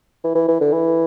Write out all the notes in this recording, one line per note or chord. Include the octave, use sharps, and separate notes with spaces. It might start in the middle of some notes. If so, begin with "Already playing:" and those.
E3
E3
E3
D3
E3